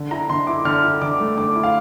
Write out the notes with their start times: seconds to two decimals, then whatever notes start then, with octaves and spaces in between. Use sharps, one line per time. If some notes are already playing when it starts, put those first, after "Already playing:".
Already playing: D3
0.11 E4 A#5
0.29 D3 C6
0.47 E4 D6
0.65 D3 F6
0.84 E4
1.02 D3 D6
1.20 A3
1.37 D3 D6
1.56 E4
1.63 F5